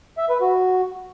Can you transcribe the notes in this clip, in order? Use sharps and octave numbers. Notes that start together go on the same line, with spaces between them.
E5
B4
F#4